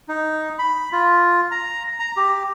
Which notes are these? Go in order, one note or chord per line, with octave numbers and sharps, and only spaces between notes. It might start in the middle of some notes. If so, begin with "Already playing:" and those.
D#4
B5
F4
A#5
A#5
G4